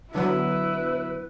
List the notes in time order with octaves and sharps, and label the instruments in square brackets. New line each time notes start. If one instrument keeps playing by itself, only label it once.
[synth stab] D3 F#3 B3 [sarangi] E4 [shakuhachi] B4